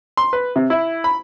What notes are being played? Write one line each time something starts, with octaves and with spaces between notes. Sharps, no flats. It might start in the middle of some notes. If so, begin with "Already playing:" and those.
C6
B4
C3
E4
B5